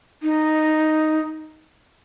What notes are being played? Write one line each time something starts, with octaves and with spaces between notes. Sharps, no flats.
D#4